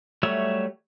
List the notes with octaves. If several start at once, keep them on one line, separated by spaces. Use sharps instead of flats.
F#3 G3 A3 C#5 E5